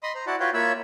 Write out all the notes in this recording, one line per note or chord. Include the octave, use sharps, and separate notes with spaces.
D#5 B5 C6 D#6
C5 A#5
E4 F#4 D5 F#5 A5
F4 F#4 B4 C#5 F5 G5
A#3 F4 C#5 E5 B5 E6